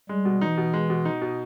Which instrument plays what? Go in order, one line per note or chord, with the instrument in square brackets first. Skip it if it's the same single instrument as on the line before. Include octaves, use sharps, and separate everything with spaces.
[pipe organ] G3 [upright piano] G#3
[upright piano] B2
[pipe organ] E3 [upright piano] D#4
[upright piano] B2
G#3
B2
D#4
B2